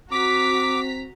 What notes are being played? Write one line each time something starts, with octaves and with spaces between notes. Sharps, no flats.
C4 F#4 A#5 D6 B6